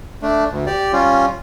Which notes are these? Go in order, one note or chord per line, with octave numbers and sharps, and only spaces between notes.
A3 D4
D2
G4 D5
G3 C#4 F4